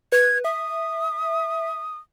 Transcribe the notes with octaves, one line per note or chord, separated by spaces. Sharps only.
B4 G#6
E5 D#6